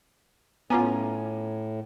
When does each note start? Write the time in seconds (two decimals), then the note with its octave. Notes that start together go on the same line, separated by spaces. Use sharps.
0.70 A2 B3 C#4 F4 G#5 A#5 D6